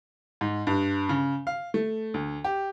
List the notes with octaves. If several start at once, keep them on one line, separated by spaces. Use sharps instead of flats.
G#2
G2
C#3
F5
A3
D2
G4